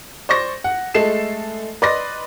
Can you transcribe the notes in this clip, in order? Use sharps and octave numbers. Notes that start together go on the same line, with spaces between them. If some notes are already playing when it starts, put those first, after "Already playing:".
C5 D5 C#6 A#6
F#5
G#3 A3 A4 C7 E7
B4 D5 D#5 C6 A#6